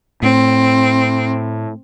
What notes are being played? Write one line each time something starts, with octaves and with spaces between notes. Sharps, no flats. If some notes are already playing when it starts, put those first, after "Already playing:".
A2 C4